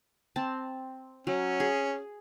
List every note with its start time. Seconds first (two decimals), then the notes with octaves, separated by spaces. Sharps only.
0.36 C4 A5
1.27 F#3 C#4
1.60 G#4